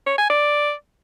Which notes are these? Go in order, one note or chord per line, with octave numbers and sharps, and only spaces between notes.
C#5
G#5
D5